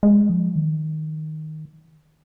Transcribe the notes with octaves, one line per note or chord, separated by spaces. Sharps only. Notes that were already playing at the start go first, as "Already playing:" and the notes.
G#3
F3
D#3